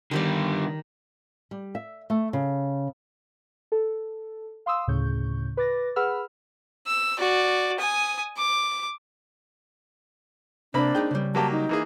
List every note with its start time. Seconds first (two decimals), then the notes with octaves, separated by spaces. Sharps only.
0.11 D3 D#3 G3 G4 D5
1.51 G3
1.75 E5
2.10 A3
2.33 C#3
3.72 A4
4.66 F5 C6 D#6 E6
4.87 D2 A2 C#3 C#6 G6
5.57 B4 D6 A6 A#6
5.96 G#4 B4 F#5 B5 E6 F6
6.87 E6
7.19 F#4 D5
7.79 G#5 D#6
8.38 D6
10.74 C3 A#3 C4 D4 B5
10.95 D#4 G#4 G5
11.11 C#3 G3
11.35 F#3 A#3 G4 A5
11.52 D#4
11.69 E3 A#3 G#4